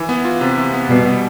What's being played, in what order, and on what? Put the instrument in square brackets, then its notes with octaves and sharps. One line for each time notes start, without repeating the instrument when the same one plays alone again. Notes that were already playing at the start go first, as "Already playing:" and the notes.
Already playing: [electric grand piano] E3
B3
F4
C3
E3
B3
[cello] B2 [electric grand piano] G3
[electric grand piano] B3